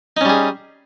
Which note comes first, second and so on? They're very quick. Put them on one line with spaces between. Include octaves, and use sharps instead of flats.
D#4 C#4 G3 G#4